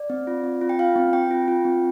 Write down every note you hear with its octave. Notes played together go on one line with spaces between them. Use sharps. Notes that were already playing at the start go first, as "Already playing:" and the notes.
Already playing: D5
C4
F4
C4
F4
G5
F4 F5
C4
C4 G5
F4
F4
C4